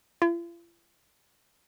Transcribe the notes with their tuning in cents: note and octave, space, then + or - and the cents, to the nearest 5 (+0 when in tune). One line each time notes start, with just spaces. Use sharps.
F4 -45